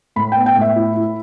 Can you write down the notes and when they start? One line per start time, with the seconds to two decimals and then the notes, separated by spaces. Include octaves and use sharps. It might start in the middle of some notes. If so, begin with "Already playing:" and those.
0.16 A2 B5
0.32 B3 G5
0.46 G5
0.56 A2
0.61 E5
0.76 E4
0.96 E4